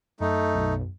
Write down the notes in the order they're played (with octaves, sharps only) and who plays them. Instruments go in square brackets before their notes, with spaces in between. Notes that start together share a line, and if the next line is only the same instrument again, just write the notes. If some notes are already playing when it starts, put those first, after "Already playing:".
[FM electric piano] F#2 [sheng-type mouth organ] A3 D#4
[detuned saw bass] B1